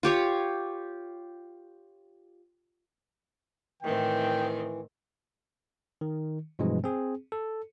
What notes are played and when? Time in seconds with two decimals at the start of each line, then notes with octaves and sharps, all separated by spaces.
0.03 F4 G4 C#5
3.82 A2 D#3 E3 C4 G5
6.01 D#3
6.59 G2 B2 E3 F3 G#3
6.84 C4 G#4
7.32 A4